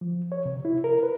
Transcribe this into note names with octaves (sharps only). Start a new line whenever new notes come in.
F3
C#5
C3
E4
A#4
B4